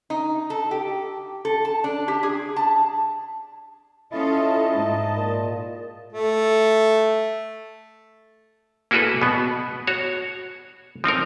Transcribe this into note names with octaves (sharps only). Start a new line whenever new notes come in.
D#4
A4
G4
A4
A5
D4
G4
G#4
A5
C#4 E4 F4 A4 D#5 A5
G#2
A#2
A3
A#3 E4 F#4 G#4 A4 B4
B2 B3
F#4 C#5
F3 C4 D#4 A#4